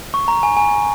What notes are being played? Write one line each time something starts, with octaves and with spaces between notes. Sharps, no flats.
C#6
A#5
G#5
G#5